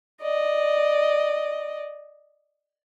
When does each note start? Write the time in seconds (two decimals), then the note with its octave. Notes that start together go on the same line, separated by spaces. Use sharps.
0.22 D5 D#5